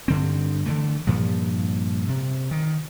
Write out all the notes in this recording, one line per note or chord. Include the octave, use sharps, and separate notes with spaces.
G2 D3 C4
D3 E3 A3
G2 A#2 F3
C3
D#3